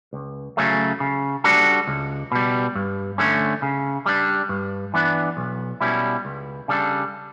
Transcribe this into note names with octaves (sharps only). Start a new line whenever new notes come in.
C#2
C#3 F#3 A3 C#4
C#3
G3 D4 F#4 A4
C#2
B2 G3
G2
D3 A3 C#4
C#3
G3 D4
G2
E3 B3 D4
B1
B2 G3 C#4 E4
C#2
C#3 G3 D4 A4